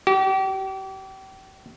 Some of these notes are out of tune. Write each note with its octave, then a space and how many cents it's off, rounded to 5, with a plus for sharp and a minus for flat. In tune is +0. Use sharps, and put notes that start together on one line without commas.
G4 -35